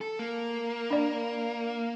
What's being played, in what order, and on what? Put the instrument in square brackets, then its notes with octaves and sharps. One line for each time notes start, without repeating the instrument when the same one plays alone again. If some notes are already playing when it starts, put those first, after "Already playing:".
[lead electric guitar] A4
A#3
[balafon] D4 D5